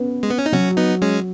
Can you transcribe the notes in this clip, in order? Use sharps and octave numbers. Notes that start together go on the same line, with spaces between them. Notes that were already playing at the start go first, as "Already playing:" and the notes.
Already playing: B3 C#4
G#3
B3
C#4
D#4
F#3 C#4 F#4
B3 D#4
G#3 C#4